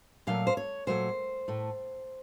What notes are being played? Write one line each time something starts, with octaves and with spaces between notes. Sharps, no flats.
A#2 F#3 A3 F5
C5
C#5
A#2 F#3 A3 C5
A2 A3